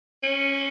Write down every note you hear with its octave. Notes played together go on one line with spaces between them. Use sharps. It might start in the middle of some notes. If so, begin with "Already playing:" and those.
C#4